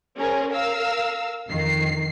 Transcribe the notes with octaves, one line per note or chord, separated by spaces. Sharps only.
C#4 G#4 A#4 C5
A#4 F5 E6
F2 D#3 C7